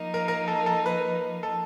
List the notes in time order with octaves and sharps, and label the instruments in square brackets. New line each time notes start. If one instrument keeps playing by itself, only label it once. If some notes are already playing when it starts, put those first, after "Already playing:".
Already playing: [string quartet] F3 A#3 D#4
[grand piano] A#4
A#4
A4
A4
B4
A4